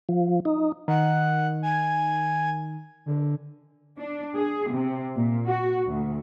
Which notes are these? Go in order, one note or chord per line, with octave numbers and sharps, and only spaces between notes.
F3
D#4
D#3 F#5
G#5
D3
D4
G#4
C3
A#2
F#4
D2